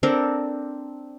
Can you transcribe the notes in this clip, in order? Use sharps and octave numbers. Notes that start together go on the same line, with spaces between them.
C4 D4 A4 A#4